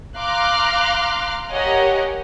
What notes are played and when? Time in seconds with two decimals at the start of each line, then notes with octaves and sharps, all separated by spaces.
0.18 F5 A#5 C6 D6 F6 F#6
1.51 G4 A#4 C#5 D#5 F#5 G#5